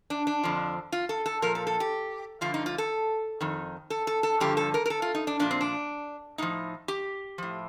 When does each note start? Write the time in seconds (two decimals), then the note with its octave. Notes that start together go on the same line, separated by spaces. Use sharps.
0.10 D4
0.27 D4
0.44 F2 D3 F3
0.92 F4
1.09 A4
1.26 A4
1.42 A#2 F3 A#4
1.55 A4
1.67 A4
1.80 G4
2.41 G2 D3 F3 F4
2.54 D#4
2.66 F4
2.78 A4
3.41 F2 D#3
3.90 A4
4.07 A4
4.23 A4
4.40 G2 D3 F3 G4
4.57 A4
4.74 A#4
4.86 A#4
4.90 A4
5.02 F4
5.15 D#4
5.27 D4
5.39 A#2 F3 D4
5.51 C4
5.61 D4
6.38 A2 F3 D#4
6.88 G4
7.38 A2 F3